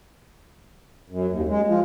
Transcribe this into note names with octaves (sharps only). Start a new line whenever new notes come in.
F#2
D#2
G#3
F3